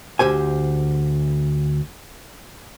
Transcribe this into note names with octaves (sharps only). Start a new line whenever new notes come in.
D2 G4 C5 G#5